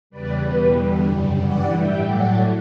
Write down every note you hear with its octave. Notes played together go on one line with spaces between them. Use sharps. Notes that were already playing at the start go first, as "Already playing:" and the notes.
E2 C#3 G3 B4 D5
E2 B2 G3 B4
E2 D3 G3
F#2 C#3 G3
G2 E3 G3 D5 F#5
A2 G3 E5 G5
A2 F#3 A3 D5 F#5